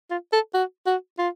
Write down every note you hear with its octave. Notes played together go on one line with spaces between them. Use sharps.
F4
A4
F#4
F#4
F4